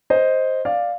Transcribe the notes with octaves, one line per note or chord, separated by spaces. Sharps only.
C5 D#5
D5 F5